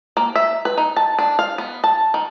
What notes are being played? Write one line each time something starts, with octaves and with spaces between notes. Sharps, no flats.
A#3
E5
B4
D#4
A5
D4
F5
B3
A5
D#3